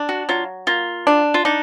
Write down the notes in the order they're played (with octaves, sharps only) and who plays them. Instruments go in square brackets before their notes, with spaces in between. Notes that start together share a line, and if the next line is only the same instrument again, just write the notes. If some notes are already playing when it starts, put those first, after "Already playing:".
Already playing: [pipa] D4
[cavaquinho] F#4
[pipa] F#3 [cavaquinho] F4
[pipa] A#3 [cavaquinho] F4
[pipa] D4
[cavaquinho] F4
[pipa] D4 [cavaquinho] D#4